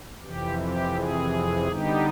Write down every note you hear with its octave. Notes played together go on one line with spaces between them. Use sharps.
F2 C3 E3 G4
G4
G#4
D3 G3 B3 D#4 G4